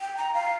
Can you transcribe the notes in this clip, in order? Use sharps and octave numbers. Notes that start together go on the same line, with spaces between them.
G5
A#5
F5